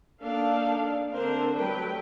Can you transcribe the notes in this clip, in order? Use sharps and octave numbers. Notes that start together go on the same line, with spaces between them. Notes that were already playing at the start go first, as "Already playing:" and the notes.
A#3 D4 D#4 A4 F5
D3 A3 C4 D4 A#4 C5
F#3 G3 A3 B4 G5